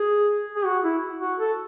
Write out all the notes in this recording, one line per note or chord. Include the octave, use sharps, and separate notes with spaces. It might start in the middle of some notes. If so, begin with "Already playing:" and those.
Already playing: G#4
G#4
F#4
E4
F#4
A4